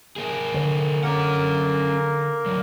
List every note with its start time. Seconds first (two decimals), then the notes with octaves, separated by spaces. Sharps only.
0.16 A#3 G#4
0.54 D3
1.03 A#3 C#4 A#4 F#5
2.46 A2 F#3